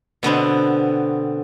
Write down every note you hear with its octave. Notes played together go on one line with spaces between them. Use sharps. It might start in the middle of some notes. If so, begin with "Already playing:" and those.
B2 D3 B3 C4